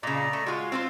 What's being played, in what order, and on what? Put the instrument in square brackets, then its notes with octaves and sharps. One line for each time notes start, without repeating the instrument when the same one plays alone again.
[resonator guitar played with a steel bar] A#2 C#3 [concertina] D5 D#5 A#5
[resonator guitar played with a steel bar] A3
[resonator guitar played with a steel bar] G#3 F4 [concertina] F#4
[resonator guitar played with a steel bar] C4 F4 C5